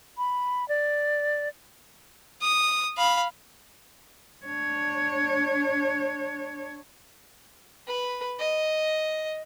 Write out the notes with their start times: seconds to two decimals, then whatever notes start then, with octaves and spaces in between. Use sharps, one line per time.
0.18 B5
0.69 D5
2.42 D#6
2.98 F5 B5
4.45 D4 C#5
7.87 B4
8.39 D#5